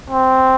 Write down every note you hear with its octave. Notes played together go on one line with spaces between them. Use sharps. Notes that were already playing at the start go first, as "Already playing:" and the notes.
C4